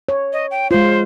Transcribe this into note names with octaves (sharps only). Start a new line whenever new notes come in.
C#5
D#5
G5
G#3 F4 C5